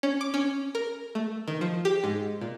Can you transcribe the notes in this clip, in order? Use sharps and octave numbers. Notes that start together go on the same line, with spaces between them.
C#4
D6
C#4
A#4
A3
D#3
F3
G4
G#2
A#2